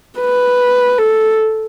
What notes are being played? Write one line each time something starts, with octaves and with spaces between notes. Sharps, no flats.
B4
A4